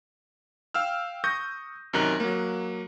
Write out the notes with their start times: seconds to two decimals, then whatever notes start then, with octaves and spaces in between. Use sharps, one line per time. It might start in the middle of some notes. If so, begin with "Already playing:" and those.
0.74 F5 G5 E6 F6
1.24 C#6 D#6 G6 A#6
1.93 F#2 C3 D#3 A#5 F#6
2.20 F#3 A#3